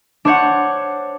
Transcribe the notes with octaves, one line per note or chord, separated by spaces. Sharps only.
D4 C5 C#5 F#5